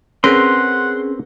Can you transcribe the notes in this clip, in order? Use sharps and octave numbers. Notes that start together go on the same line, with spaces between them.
C4 C#4 G#4 A#4 B4 F#5 C6